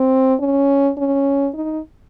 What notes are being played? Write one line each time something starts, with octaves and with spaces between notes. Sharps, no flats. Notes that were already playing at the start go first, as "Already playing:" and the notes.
Already playing: C4
C#4
C#4
D#4